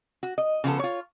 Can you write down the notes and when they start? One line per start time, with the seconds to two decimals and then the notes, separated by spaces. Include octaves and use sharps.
0.23 F#4
0.38 D#5
0.64 C#3 F3 B3 A4
0.79 F4 C#5